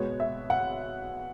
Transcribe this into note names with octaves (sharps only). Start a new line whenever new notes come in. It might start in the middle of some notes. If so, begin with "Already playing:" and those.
Already playing: B2 G#3 B3 C#5
E5
F#5